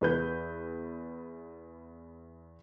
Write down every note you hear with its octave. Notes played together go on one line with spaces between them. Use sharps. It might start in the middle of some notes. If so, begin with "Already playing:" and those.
E2 B4 G6